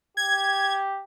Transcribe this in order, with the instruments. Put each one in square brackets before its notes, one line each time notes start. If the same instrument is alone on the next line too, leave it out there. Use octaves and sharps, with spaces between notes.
[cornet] G4 [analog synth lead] G#6